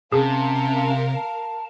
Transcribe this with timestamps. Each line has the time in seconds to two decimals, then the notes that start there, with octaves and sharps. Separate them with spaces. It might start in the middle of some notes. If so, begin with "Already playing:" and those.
0.12 C3 C#4 G#4 A#4 F5 A5
1.15 A5